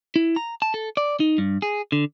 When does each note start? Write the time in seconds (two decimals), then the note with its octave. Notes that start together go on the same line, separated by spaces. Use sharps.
0.16 E4
0.36 A#5
0.62 A5
0.74 A4
0.97 D5
1.20 D#4
1.38 G2
1.62 G#4
1.92 D3